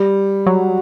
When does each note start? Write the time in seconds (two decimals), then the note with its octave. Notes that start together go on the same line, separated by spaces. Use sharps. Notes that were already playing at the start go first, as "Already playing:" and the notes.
Already playing: G3
0.46 F#3